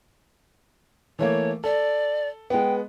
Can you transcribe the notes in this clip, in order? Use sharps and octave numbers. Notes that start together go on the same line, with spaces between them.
E3 A3 A#3 C#5
A4 D5
G#3 B3 G5